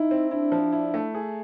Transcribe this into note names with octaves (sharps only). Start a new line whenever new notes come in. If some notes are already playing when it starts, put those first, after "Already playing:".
Already playing: D#4 E4
C4
D4 E4
F3
E4
A3
G#4